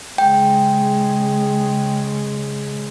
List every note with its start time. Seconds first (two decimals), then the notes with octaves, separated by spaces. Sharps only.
0.18 C#3 G#3 G5